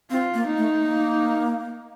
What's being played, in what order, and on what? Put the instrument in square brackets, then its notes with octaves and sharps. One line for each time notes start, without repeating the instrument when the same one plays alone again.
[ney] C4 [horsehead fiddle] F4
[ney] A#3
[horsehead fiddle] D#4
[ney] A3
A#3